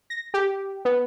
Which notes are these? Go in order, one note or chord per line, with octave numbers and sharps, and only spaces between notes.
A#6
G4
B3